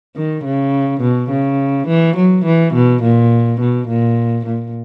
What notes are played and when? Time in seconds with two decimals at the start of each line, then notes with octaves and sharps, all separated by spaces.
0.16 D#3
0.44 C#3
1.01 B2
1.30 C#3
1.87 E3
2.16 F#3
2.45 E3
2.74 B2
3.03 A#2
3.60 B2
3.88 A#2
4.46 A#2